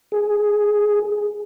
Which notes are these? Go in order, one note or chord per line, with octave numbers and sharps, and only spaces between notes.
G#4